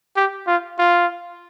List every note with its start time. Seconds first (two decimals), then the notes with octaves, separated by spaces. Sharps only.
0.16 G4
0.47 F4
0.79 F4